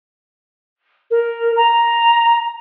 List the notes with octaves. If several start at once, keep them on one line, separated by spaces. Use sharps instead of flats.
A#4
A#5